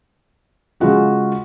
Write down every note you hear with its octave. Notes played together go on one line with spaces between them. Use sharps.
C#3 G#3 C#4 F4 F#4 G#4